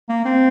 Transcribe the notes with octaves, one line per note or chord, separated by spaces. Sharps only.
A#3
C4